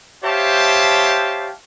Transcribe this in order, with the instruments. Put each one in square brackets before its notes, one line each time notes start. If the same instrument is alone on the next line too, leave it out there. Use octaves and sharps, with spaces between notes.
[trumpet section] G4 C5 C#5 E5 F5 A5